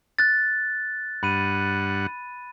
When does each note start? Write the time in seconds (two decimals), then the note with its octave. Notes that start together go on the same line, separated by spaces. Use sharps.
0.19 F#6 A6
1.23 G2 F#5 B5 D#7